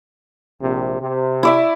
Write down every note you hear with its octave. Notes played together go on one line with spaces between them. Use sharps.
A#1 C3
C3
E4 D5 E5